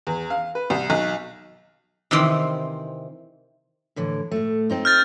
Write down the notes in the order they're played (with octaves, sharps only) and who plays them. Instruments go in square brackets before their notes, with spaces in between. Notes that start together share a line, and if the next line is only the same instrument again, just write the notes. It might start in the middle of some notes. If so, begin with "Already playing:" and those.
[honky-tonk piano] E2
F5
B4
C2
B1
[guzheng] C3 D#3 E3 C4
[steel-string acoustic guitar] A2 D3 E3
A2 A3
C4 D#4 F4
[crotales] F6 G6 A6